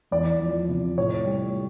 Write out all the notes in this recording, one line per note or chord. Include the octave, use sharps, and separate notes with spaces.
E2 D5
F3
C3
A2 C#5
G3